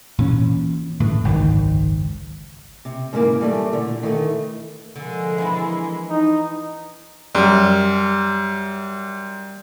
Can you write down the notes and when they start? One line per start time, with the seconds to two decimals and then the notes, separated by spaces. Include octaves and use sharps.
0.18 A#2 E3 C#4
1.00 A2 D3 E3
1.25 G#1 C#2 F#2 D#3
2.85 C3
3.13 G#2 C#3 E3 A#3
3.41 E3 G3 A3 D5
3.73 A#2 D3
4.03 D#3 E3 A3
4.96 D3 F3 G#3 A#3
5.38 E3 D4 E4
6.10 D#4
7.35 F#2 G3